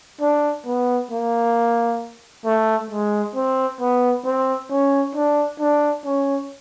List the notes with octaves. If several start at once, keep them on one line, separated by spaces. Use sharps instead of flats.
D4
B3
A#3
A3
G#3
C4
B3
C4
C#4
D4
D4
C#4